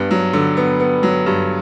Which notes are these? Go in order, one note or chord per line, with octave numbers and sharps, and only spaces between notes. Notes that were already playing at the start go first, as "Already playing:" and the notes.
Already playing: G2 B3
F#3
D3
B3
B3
F#3
G2